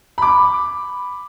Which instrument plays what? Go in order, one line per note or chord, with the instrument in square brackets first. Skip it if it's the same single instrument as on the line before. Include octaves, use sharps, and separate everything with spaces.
[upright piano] B5 D6